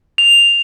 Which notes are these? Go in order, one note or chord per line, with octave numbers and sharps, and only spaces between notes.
F7